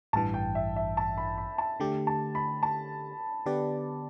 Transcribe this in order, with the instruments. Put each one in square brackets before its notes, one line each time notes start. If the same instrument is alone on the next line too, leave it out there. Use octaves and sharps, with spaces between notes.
[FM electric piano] A1 G2 E3 [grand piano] A5
[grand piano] G5
E5
E5
A5
B5
B5
A5
[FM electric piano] D3 A3 G4
[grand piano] A5
B5
A5
[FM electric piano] D3 B3 G4 B4 D5